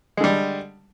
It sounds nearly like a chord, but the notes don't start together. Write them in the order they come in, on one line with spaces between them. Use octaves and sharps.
G#3 D3 G3